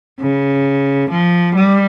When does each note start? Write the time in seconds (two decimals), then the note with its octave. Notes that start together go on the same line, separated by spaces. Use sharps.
0.20 C#3
1.10 F3
1.55 G3